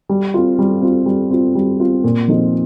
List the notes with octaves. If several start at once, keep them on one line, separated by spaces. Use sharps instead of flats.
G3
C4 F4
G3
C4 F4
G3
C4 F4
G3
C4 F4
A#2
F3 C4 D#4